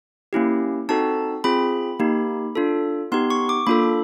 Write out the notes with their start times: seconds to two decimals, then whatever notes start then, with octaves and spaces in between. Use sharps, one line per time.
0.33 A#3 C#4 E4 G4
0.89 C4 D#4 F#4 A4 A5
1.44 C4 F4 G#4 B5
1.99 A#3 D#4 G4
2.55 D4 F4 A4
3.12 B3 D#4 G4 C6
3.30 C#6
3.49 D6
3.67 A#3 D4 F4 A4 B5